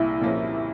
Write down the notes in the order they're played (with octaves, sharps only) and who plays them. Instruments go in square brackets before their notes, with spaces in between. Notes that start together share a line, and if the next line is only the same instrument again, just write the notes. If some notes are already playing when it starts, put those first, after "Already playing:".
Already playing: [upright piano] C2 A#2 A#3 [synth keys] E4
[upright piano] A#2 F3 A#3 C#4